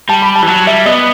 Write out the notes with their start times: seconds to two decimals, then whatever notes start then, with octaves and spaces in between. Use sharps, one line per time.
0.09 G3 A5
0.22 B5
0.36 A5
0.42 E3
0.47 F#3 A5
0.66 G3 E5
0.86 B3 D#5